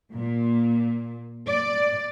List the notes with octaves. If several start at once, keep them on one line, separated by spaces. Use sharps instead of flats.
A#2
D5